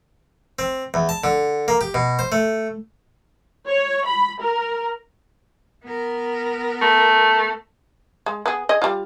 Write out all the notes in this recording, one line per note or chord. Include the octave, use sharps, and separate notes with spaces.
C4
E2
A5
D3
A#3
G4
B2
C5
A3
C#5
B5
A#4
B3 A#4
A3
G#3
B3 G#4
G#4 D#5
G3 F4